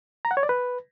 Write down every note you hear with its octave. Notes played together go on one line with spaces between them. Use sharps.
A#5
F#5
C#5
D5
B4